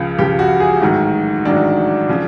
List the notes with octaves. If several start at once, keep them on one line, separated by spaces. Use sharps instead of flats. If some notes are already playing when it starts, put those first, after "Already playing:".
Already playing: C#2 C#3 F3
C#2 C#3 F3 G4
F#4
G#4
A1 G#2 D#3 F#3 F#4
A1 G#2 D#3 F#3 D4
C#3 F3